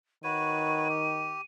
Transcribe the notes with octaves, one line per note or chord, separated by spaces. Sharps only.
D#3 F#4 B4 C#5 D#7
G4